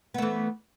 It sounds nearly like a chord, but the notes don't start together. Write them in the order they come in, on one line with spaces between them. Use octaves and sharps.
B3 A3 E3